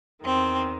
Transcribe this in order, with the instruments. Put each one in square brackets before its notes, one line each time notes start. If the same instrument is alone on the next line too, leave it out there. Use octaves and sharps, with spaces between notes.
[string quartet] E2 D#3 C4